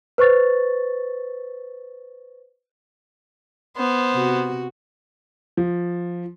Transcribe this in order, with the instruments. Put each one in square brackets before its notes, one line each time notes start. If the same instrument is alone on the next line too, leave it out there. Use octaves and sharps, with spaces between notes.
[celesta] B4 C5 C#6 A6
[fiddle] B3 C5
[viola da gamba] C3 F#4
[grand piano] F3